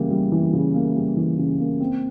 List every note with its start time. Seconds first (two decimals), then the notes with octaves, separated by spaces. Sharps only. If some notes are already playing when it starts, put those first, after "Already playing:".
Already playing: C#3 E3 G3 A#3
0.11 G3
0.32 E3
0.53 C#3
0.75 A#3
0.95 G3
1.17 E3
1.38 C#3
1.59 A#3
1.80 C4